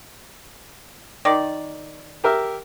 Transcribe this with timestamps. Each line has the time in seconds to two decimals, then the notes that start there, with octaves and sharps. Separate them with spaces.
1.25 D#3 D5
2.24 G4 A#4 E5